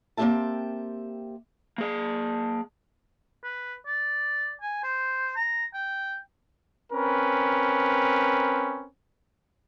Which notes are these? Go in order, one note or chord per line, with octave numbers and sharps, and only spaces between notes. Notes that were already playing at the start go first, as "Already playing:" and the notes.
A#3 C4 C#4 G4 E5 A5
A#3 G#4
B4
D5
G#5
C5
A#5
G5
C4 C#4 A#4 B4